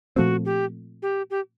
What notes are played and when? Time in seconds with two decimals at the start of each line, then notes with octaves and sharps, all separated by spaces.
0.16 A#2 F3 A3 C4 F#4
0.45 G4
1.02 G4
1.30 G4